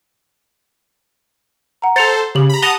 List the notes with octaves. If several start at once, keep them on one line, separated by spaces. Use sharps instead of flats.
F#5 A#5
A4 C5 A6 C#7 F7
C#3 G4 F#7
A#5 B5
F#5 A5 D#6 A#6 F7 G7